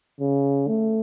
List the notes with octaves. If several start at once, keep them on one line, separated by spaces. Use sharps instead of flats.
C#3
A3